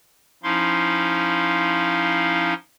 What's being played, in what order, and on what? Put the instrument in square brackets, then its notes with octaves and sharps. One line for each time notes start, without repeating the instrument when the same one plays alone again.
[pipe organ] F3 C#4 D#4 E4 F5 C6